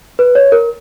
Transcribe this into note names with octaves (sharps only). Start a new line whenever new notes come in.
B4
C#5
A#4